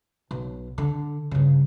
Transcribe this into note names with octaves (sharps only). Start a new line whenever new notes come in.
B1
D3
G2 C#3